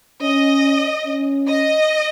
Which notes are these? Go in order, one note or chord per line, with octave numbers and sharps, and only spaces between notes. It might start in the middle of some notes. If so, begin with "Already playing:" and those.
C#4 D#5
C#4
D#5